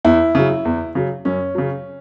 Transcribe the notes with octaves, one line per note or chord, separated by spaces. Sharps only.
E2 E4
C#3 F#3
E2
C#3 F#3
F#2 C#4
C#3 F#3